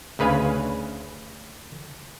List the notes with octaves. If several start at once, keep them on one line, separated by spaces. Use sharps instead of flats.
D2 C#3 B4 F5 G#5